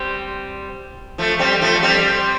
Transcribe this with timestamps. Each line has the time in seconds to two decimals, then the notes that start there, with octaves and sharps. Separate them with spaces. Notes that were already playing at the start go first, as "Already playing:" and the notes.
Already playing: G3 C4
1.18 F3 A3
1.39 G3 C4
1.62 F3 A3
1.82 G3 C4